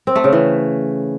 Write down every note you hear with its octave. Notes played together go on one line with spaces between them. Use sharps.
C4
A3
C#3
E3